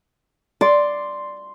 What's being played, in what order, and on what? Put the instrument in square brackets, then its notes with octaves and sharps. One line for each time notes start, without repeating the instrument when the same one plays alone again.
[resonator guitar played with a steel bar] D5 [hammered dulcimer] C6